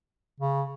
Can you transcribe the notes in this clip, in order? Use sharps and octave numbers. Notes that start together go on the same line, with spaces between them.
C#3